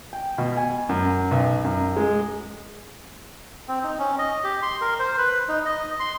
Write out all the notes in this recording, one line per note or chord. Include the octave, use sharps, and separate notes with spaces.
G5
B2
G#5
F#2
B1
F#2
G#3
C4
D#4
C#4
D#5
G4
C6
A#4
C5
B4
D#4
D#5
C6